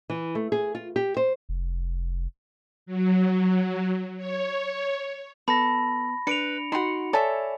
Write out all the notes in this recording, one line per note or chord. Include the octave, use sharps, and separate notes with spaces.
E3
A3
G#4
F4
G4
C5
F1
F#3
C#5
B3 A4 B5 A#6
D4 B4 C#7 D7 F7
D#4 F#4 F#5 B5 C6
A4 C#5 D5 E5 G#5